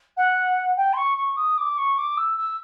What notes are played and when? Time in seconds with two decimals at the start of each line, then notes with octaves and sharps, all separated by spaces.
0.17 F#5
0.76 G5
0.93 C6
0.96 C#6
1.17 C#6
1.36 D#6
1.57 D6
1.77 C#6
1.97 D6
2.17 E6
2.37 E6